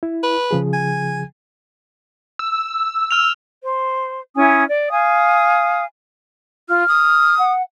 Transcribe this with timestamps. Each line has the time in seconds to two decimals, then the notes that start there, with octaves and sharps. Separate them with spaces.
0.03 E4
0.23 B4
0.51 C#3 F3 G#4
0.73 G#5
2.39 E6
3.11 F6 F7
3.61 C5
4.36 C#4 E4 G#5 D#6
4.68 D5
4.90 F5 G#5 D#6
6.69 F4 F6
6.88 D#6
7.38 F#5